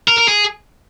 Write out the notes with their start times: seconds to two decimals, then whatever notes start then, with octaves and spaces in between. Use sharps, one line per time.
0.08 A#4
0.18 A#4
0.28 G#4